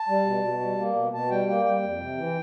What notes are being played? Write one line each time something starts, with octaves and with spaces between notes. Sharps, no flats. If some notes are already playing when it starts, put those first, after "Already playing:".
Already playing: A5
G3
B2
B2
G3
A#3
B2
B2 A5
G3 G5
A#3 G5
G3 G5
F2
C3
E3